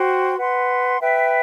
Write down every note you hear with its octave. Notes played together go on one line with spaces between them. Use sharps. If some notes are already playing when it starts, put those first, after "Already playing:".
Already playing: F#4 C5 G5 C6
B4 F#5 C6
B4 E5 G5